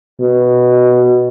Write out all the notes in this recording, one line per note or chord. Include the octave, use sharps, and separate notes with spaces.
B2